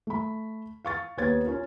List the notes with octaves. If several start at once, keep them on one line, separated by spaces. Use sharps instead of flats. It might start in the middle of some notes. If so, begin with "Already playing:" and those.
A3 B5
F5 C#6 A6
D#2 B3 C#5 G#6 A6
C#4 F4 A#4